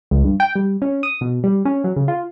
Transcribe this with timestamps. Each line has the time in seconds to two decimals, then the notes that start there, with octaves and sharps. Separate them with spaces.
0.11 C#2
0.24 G2
0.40 G5
0.56 G3
0.82 C#4
1.03 D#6
1.21 B2
1.44 G3
1.65 C#4
1.84 F#3
1.96 C#3
2.08 F4